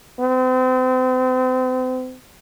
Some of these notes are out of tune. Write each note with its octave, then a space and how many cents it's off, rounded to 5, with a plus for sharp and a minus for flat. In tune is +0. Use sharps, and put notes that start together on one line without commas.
C4 -35